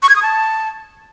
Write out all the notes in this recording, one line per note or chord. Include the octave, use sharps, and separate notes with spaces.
C#6
G#6
D#6
A5